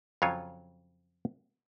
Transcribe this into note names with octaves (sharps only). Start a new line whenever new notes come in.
F2 C#3 F#3 F4 C#5 G#5